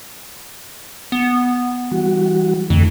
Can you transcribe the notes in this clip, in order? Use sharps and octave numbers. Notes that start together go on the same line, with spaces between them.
B3
E3 G3 F#4
F2 D3 E3 A3